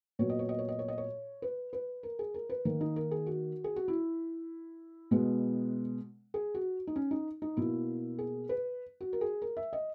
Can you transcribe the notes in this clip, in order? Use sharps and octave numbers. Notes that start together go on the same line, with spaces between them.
A#2 F#3 B3 C#5
D#5
C#5
D#5
C#5
D#5
C#5
D#5
C#5
B4
B4
A#4
G#4
A#4
B4
D#3 A#3 A#4
D#4
A#4
G#4
F#4
G#4
F#4
E4
B2 G#3 B3
G#4
F#4
D#4
C#4
D#4
D#4
B2 A#3 E4
G#4
B4
F#4
A#4
G#4
A#4
E5
D#5